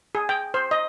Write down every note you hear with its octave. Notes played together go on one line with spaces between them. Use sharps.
G#4
G5
C5
D#5